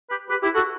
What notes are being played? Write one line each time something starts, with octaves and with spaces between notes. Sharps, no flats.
G4 B4
G4 B4
E4 G4
F#4 A4